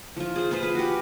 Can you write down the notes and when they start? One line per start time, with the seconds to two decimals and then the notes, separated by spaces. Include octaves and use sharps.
0.16 F3 F4
0.36 G#4 C5
0.51 F4 G#4 B4 C5
0.63 B4
0.75 F#4 G4